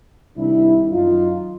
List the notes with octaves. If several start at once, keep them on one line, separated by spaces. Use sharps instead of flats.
C2 C3 D#3 D4 E4
F#2 D#3 D#4 F4